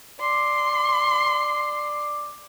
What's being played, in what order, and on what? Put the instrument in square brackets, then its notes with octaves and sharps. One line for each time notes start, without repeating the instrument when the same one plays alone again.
[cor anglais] D5 [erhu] C6